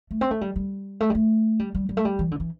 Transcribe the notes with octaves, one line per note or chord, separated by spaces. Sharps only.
A3
C4
A3
G3
G3
A3
G3
A3
G3
G3
G3
A3
G3
E3
D3
E3